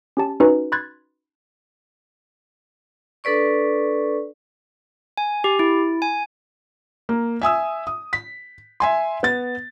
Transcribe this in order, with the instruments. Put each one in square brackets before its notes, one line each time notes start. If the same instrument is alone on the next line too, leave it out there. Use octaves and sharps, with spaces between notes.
[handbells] C#4 G4 A5
C#4 D#4 F#4 B4
B5 C6 F#6 G#6 A6
[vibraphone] D4 A4 B4 D5 C#6
[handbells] G#5
G4
E4
G#5
[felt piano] A#3
E5 G#5 D#6 E6
D#6
B6
E5 G#5 C6
B3 A6